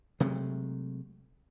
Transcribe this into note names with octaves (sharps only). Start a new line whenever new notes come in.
C3 F#3 G#3 A3